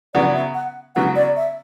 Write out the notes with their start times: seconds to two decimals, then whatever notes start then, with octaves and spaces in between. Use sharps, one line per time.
0.14 C#3 F#3 B3 D5
0.34 E5
0.54 F#5
0.95 C#3 F#3 B3 F#5
1.16 D5
1.36 E5